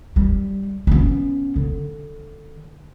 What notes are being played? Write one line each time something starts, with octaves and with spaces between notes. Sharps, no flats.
G3
B3 C#4
D3